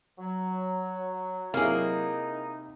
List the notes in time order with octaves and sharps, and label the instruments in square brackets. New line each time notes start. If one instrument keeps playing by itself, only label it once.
[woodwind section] F#3
[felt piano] C3 E4 [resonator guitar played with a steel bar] A#3 G#4 [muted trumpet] D#4